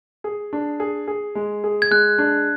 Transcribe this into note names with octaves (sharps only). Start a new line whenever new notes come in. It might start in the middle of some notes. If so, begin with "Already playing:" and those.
G#4
D4
G#4
G#4
G#3
G#4
G#6
G#3 F#6
D4